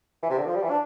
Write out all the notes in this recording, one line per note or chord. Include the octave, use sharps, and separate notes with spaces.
E3
C3
D3
F3
G3
E3
D4